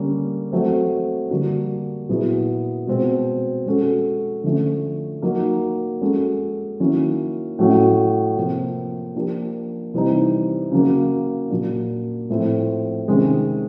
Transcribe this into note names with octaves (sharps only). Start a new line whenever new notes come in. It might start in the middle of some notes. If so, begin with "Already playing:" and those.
Already playing: D3 G3 A#3 C#4
F#3 A3 C4
D3 G3 A#3 D4 F#4
A#2 F#3 B3 E4 G#4
B2 G#3 C4
G#3 C#4 F#4 A4
D3 F3 A3 C#4
F#3 A#3 D#4
G#3 C#4 F#4 A4
D#3 F#3 A#3 C#4 E4
A2 F#3 A3 C#4 F#4
C3 F3 A#3
F3 A#3 D4 G4
C3 E3 G3 C4 D#4
C#3 F#3 A#3
A#2 F#3 A#3 D4
A2 F3 A3 C4 E4
C3 D#3 G#3 C#4